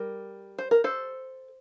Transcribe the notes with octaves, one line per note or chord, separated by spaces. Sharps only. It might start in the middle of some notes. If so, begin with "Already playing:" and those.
Already playing: G3 A#4
C5
A#4
A4 C5